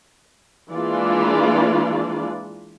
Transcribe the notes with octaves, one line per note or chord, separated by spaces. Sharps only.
E3 G#3 A#3 D4 F4 D5